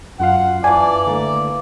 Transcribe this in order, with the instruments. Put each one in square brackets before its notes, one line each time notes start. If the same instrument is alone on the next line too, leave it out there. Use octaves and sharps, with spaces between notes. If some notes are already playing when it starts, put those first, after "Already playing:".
[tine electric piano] F#2 F4 F5 [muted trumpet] F#5
[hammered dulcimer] E3 A5 [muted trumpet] D5 [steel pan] G#5
[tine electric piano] D3 A3 [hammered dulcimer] A#3